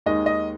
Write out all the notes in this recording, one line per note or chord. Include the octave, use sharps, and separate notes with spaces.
D#2 D#3 G#3 D#5
D#5